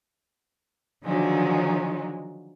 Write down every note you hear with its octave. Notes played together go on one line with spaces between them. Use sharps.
D3 D#3 F3 F#3 G#3 D#4